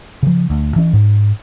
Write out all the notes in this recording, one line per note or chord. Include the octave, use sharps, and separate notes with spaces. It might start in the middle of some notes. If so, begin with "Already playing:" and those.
C#3 F3
D2
E3 C#4
G#2